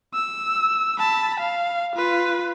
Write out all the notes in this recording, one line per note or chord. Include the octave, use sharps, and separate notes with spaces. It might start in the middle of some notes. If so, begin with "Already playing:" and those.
E6
A5 B5
F5
F4 B4